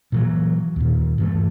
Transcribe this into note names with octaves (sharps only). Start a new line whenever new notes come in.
A#2 E3 F#3
D#2 A#2
G2 E3 G#3 A3